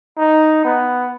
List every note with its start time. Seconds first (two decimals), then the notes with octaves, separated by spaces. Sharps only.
0.18 D#4
0.65 B3